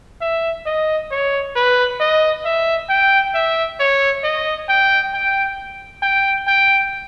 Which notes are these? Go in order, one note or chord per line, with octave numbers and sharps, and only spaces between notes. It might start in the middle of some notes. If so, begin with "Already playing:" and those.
E5
D#5
C#5
B4
D#5
E5
G5
E5
C#5
D#5
G5
G5
G5
G5